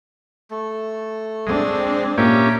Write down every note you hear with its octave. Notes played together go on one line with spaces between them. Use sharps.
A3
G#3 C4 D4
A#2 A#3 C#4 G4 E5 A#5